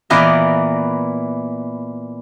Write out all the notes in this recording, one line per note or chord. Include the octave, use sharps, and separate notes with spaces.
A#2 E3 B3 A#4 D5 D#5